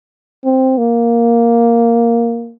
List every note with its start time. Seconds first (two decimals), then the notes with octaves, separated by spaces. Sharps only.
0.45 C4
0.78 A#3